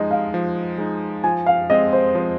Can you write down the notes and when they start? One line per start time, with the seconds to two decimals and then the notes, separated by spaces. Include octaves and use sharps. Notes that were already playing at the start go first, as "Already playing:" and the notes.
Already playing: F3 G#3 D#4 D#5
0.11 F5
0.34 F3
0.78 G#3 D#4
1.24 F3 G#5
1.46 F5
1.70 G#3 C4 D#5
1.93 C5
2.15 F3 C5